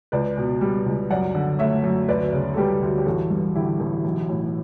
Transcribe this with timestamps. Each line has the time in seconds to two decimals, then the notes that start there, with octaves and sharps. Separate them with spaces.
0.12 C#2 B4 D5
0.38 B2
0.61 G3
0.86 C#2
1.11 F#2 D5 F#5
1.35 D3
1.59 A3 C#5 E5
1.84 F#2
2.09 D2 B4 D5
2.33 C#3
2.54 A4
2.57 G3 G4 B4
2.82 D2
2.98 G4
3.06 A1 F#4 A4
3.30 G2
3.55 D3 E4 G4
3.80 A1
4.05 B1
4.29 A2